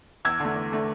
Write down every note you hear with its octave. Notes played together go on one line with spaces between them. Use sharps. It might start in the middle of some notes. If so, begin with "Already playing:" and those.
E2 E6 G#6
D3 A3
E2
D3 A3